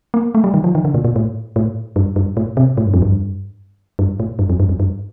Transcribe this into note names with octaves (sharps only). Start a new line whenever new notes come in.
A#3
A3
G3
D#3
F3
D#3
D3
A#2
A#2
A2
A2
G2
G2
A2
C3
A2
G2
F2
G2
G2
A2
G2
F2
G2
F2
G2